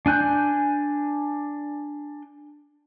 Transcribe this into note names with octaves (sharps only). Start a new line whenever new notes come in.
D4 G#5 F#6 G6